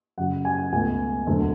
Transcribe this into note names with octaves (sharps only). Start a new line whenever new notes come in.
F#2 C#3 F#3 F#5
G#5
C#2 B2 A3 G#5
E1 D2 D3 F#3